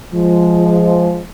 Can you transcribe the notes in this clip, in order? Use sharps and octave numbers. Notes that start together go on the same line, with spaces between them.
F3 G#3